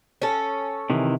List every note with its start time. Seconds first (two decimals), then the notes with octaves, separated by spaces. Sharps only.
0.22 C#4 A4
0.90 C3 D#3 E3